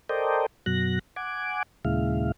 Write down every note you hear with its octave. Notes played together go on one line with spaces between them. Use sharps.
A4 A#4 C5 D5 D#5 G5
F#2 B2 F#3 F#6 A#6
F#5 G#5 D6
D#2 A#2 C#3 G#3 E4 F5